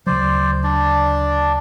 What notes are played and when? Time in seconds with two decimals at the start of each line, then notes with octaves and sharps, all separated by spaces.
0.07 D2 C#3 F#3 C5 D5
0.64 D4 D5